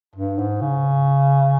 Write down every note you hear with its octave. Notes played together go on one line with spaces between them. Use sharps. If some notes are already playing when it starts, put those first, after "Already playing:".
G2
G#2
C#3